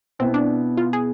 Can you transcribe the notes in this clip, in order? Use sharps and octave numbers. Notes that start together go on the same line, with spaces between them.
B2 B3 C4 E4
D4
F4
G#4